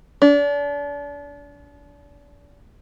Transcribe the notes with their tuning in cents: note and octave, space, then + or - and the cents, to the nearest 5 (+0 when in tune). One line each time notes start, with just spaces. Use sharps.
D4 -35